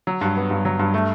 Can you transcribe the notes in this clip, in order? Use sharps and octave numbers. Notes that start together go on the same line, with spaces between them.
F#3
G2
B3
G2
F#3
G2
A3